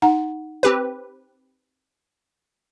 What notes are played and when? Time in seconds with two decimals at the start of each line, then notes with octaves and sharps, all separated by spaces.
0.02 D#4 F#5 A#5
0.63 C4 G4 B4